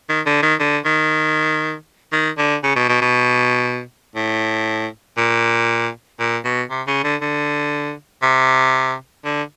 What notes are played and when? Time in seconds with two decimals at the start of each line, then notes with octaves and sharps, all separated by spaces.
0.09 D#3
0.26 D3
0.42 D#3
0.60 D3
0.85 D#3
2.12 D#3
2.38 D3
2.63 C#3
2.76 B2
2.88 B2
3.01 B2
4.15 A2
5.17 A#2
6.19 A#2
6.44 B2
6.70 C3
6.87 C#3
7.04 D3
7.21 D3
8.22 C3
9.24 D3